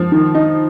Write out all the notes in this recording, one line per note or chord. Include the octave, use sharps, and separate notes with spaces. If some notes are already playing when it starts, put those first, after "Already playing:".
Already playing: F3
D#3
D#4